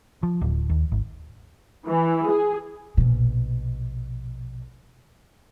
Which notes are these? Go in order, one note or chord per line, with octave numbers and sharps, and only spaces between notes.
F3
D1
D#2
G#1
E3
G#4
A#1 B2